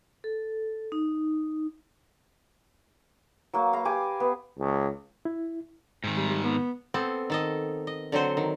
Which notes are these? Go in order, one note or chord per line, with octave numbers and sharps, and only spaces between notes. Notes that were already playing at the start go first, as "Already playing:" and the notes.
A4
D#4
F#3 A#3
F5 A#5 B5
G4 G#5 D6
B3
C#2
E4
G#2 D#3
G3
G3
B3
B3 C4 A4
D#3 A4 D#5
D#5
D3 F#3 C4 C5
D#3